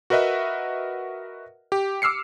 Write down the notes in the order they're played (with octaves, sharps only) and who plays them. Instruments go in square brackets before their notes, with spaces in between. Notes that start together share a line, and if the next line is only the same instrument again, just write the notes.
[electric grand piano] F#4 A#4 B4 D#5 E5 F#5
G4
D6 E6 F6 C7 C#7